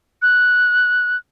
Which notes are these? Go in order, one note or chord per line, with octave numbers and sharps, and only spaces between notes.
F#6